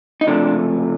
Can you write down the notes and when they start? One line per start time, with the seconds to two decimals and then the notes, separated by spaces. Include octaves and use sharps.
0.21 D#4
0.27 C#2 C3 F3 A3 D4